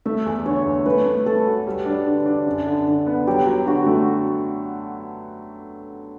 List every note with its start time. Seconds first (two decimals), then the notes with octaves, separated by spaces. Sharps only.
0.05 A3 E5
0.26 E2
0.46 D3 C#5
0.66 E2
0.86 A3 B4
1.06 A3
1.26 A3 A4
1.47 F#4
1.67 G3
1.86 D4
2.07 D3
2.26 D4
2.47 F#2
2.67 D3
2.87 D3
3.07 B3
3.27 F#3 G4
3.46 F#3
3.66 D3 F#4
3.87 A3